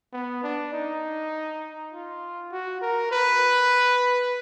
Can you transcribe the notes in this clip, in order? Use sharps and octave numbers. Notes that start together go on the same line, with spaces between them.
B3
D4
D#4
F4
F#4
A#4
B4